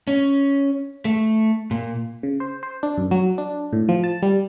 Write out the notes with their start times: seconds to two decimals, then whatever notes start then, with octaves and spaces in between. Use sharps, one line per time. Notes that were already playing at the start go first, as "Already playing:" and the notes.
0.08 C#4
1.05 A3
1.71 A#2
2.23 C#3
2.40 C5
2.63 C5
2.83 D4
2.98 F#2
3.11 F#3
3.38 D4
3.73 A2
3.89 F3
4.04 A5
4.22 G3